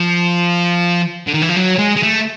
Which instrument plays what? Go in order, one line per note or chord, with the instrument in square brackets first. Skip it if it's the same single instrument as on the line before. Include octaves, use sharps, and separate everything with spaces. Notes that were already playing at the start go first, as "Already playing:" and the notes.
Already playing: [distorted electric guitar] F3
D3
D#3
E3
F3
F#3
G#3
G#3
A3